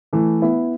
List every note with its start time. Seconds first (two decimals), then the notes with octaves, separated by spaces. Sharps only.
0.13 E3 A3
0.42 B3 E4